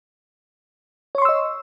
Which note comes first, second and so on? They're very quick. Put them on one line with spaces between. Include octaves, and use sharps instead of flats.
C#5 C#6 C6 E6 D#5